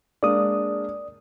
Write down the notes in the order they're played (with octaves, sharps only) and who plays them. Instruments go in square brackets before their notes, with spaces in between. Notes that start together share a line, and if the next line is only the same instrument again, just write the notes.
[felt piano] G#3 A#3 D4 [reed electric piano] D5 D#6